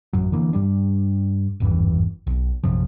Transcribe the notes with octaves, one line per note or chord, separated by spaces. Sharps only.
A1 F#2 F#3
D3 E3 A#3
G2 G3 D4
G#1 E2 G2 E3
B1
A#1 F#2 C3 F3